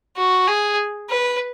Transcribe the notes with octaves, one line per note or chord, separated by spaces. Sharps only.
F#4
G#4
B4